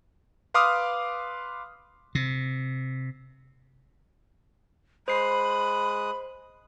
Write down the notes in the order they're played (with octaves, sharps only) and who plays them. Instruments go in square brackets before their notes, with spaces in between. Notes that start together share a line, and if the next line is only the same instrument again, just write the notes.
[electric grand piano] B4 F5 C6 D6 D#6 F6
[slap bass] C3
[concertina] G#3 D#6 F#6 [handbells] C5 C7 [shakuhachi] B5